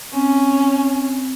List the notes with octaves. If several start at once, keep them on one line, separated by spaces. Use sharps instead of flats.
C4 C#4